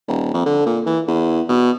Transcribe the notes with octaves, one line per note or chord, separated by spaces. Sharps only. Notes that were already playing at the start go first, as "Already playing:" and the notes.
D#1
F2
D3
A#2
E3
E2
B2